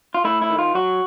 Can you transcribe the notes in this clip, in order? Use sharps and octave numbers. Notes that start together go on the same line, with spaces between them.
F4
A3 E4
E4
D#3
F4
F#3 F#4